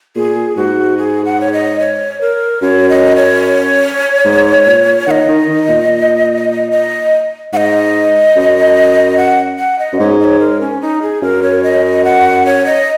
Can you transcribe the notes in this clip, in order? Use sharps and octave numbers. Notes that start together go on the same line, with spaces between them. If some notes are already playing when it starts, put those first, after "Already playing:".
A#2 G#4
G#2 F#4
G#4
F#5
C#5
D#5
C#5
A#4
F#2 C#5
D#5
C#5
G#2
A#2
D#3 D#5 F#5
D#3
D#3
A#2
D#5
G#2 D#5 F#5
F#2
F#5
F#5
D#5
F#2
G#2 C#5
D#5
C#5
A#4
C#4
D#4
G#4
F#2 A#4
C#5
D#5
F#5
C#5
D#5